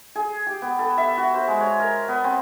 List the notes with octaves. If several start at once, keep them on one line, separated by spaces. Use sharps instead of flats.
G#4
G4
B3
A4
E5
F#4
C5
G#3
C#5
A#4
B3
C4